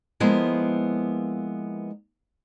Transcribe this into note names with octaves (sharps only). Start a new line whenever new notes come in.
F3 G#3 A#3 B3 E4